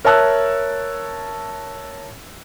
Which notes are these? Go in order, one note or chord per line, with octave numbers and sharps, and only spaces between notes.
A#4 C#5 E5 A5 E6 F#6